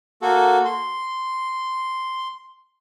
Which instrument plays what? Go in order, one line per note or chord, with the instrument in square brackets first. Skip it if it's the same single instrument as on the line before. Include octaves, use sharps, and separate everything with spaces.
[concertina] A#3 F#4 A4
C6